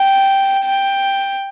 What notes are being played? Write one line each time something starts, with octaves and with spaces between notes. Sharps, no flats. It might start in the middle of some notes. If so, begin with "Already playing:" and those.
Already playing: G5
G5